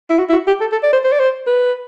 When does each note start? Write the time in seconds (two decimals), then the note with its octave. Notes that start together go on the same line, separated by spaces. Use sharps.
0.10 E4
0.19 F#4
0.29 E4
0.33 F#4
0.47 G4
0.61 A4
0.72 A4
0.83 D5
0.93 C5
1.05 C5
1.12 D5
1.20 C5
1.47 B4